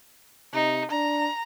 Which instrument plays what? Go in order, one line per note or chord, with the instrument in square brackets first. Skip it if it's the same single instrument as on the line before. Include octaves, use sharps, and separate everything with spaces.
[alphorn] C3 [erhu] D#4
[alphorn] D4 [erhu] A#5